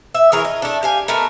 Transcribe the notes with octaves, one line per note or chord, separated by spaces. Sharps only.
E5
E3 G#4 A#4 C#5
D#5
A3 D4
G4 F5 G#5
A3 B3 D#4 A#4